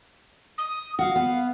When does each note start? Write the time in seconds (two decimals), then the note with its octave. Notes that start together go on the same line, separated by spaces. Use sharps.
0.58 D#6
0.99 F#4 F5
1.15 B3